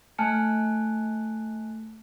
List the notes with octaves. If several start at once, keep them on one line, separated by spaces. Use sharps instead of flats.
A3 G#5 A5 F6 F#6 C#7